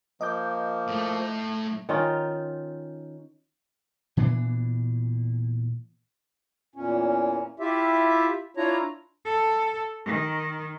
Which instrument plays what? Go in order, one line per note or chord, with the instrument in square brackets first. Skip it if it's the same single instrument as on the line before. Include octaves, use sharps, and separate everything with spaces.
[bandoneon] F3 A#3 [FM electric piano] D#5 D6 G6
[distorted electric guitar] A2 A3
[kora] D#3 C#4 D#4 F4
[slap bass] A#2 E3 B3 D4
[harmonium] E2 A#2 C#4
E4 F4 G4 E5
D4 E4 F4 C#5 A#5
[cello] A4
D#3